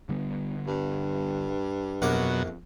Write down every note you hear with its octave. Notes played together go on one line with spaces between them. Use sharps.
D3 G3 B3
G2
A#1 F2 B2 F#3 A#3 D6